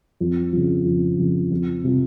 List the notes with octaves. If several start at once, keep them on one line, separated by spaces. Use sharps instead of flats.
F2
C#3 F3
F2
C#3 F3
F2
C3 F3